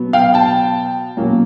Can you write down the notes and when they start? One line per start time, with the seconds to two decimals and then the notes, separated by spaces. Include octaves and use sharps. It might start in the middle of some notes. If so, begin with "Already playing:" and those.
Already playing: B2 F#3 B3
0.13 F5 G5
0.34 G5 A5
1.17 B2 F#3 A#3 C#4